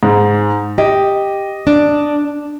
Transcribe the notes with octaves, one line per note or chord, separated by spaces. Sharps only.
G#2
G4 D#5
D4